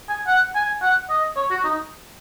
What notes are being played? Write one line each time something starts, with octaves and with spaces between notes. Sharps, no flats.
G#5
F#5
G#5
F#5
D#5
C#5
F#4
D#4